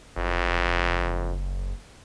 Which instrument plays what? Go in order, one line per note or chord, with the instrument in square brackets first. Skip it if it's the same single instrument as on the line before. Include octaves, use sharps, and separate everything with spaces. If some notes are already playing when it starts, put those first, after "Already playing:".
[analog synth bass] F#1 [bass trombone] F2